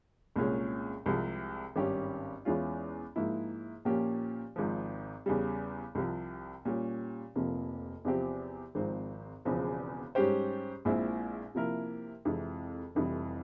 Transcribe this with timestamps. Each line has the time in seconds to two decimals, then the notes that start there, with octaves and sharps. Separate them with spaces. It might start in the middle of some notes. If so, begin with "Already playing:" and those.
0.36 C2 A#2 G#3 C#4
1.06 C2 C3 F3 G#3
1.76 G#1 G2 G3 C#4 G4
2.45 E2 E3 G#3 C#4 F4
3.16 G#2 F3 A#3 E4
3.85 A#2 F3 A#3 C#4 G4
4.56 G#1 G#2 F3
5.26 E2 C#3 G3
5.95 C2 C3 F3
6.65 A#2 G3 C#4 G4
7.36 F1 F2 C3 F3 A#3
8.05 E2 C3 F3 C4 G4
8.75 G#1 G#2 F3 C4
9.45 E1 E2 C#3 F3 C4
10.15 G#2 G3 C#4 G4 C5
10.85 A#1 A#2 G#3 C4 E4
11.55 C3 F3 A#3 E4 A#4
12.25 F2 C3 E3 G#3
12.95 F1 F2 E3 G3